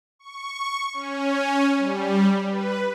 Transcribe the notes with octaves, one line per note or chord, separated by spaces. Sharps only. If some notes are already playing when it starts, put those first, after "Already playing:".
C#6
C#4
G3
B4